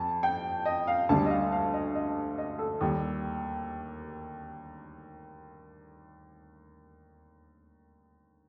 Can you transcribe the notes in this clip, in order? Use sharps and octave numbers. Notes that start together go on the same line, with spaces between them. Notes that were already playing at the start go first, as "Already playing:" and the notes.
Already playing: F2 A5
G5
D#5
F5
D2 D3 G3 A5
D#5
F5
F5
D#5
D#5
D#5
A4
D#2 D#3 G3